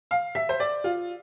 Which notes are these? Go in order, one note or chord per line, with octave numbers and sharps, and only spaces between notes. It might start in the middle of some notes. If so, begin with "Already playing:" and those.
F5
E5
C5
D5
F4